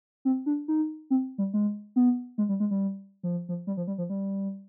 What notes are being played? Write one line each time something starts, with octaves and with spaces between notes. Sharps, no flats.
C4
D4
D#4
C4
G3
G#3
B3
G#3
G3
G#3
G3
F3
F3
G3
F3
G3
F3
G3